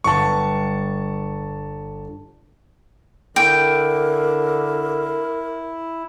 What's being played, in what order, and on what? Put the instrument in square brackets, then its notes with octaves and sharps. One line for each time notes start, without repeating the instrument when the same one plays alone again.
[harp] G1 [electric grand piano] A5 C#6
[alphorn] D3 [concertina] E4 [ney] A#4 [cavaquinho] G5